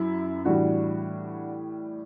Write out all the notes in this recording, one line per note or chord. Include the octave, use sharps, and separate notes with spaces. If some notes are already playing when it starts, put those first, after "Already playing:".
Already playing: F#2 E4
A2 E3 G3 D4 F#4